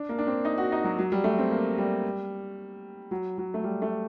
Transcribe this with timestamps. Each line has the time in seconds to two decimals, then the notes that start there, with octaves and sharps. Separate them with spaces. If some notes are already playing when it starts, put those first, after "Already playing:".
Already playing: D4
0.09 A#3
0.18 D4
0.27 C4
0.45 D#4
0.58 F#4
0.72 D#4
0.84 F#3
0.99 F#3
1.12 G3
1.24 A3
1.38 C4
1.51 A#3
1.78 G3
3.11 F#3
3.38 F#3
3.54 A3
3.64 G3
3.82 A3